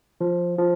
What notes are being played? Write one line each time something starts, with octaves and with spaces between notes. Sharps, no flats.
F3
F3